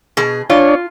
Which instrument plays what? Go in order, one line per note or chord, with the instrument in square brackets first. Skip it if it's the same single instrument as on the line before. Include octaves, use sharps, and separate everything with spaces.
[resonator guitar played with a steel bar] B2 G#4
[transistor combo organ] D4 C#5 [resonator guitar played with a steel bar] F4